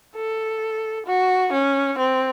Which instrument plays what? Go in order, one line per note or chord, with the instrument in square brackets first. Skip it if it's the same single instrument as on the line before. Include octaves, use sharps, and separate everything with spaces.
[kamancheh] A4
F#4
C#4
C4